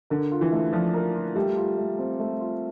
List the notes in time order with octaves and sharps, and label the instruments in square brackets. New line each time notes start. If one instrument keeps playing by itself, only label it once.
[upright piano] D3 [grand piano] A#4
[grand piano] F4
[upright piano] E3
[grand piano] A3
[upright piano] F3 [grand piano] D4
[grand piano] A#4
F4
[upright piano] G3 [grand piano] A3
[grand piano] F4
A3
C4
A3
F4